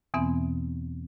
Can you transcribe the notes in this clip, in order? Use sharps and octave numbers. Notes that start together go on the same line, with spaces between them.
E2 B2 E3 B3 C4 E5